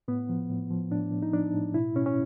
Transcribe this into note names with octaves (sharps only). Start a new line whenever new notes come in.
A2 B3
F3
A2
F3
A2 D4
A2
D#4
F3 D4
A2
B2 E4
B2 C#4
C#4